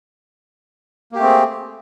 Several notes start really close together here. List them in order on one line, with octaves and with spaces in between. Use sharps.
A#3 G4 A3 C4 G#4